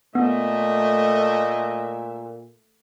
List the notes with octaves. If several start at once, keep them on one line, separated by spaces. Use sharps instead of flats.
A#2 A3 B3 D#5 E5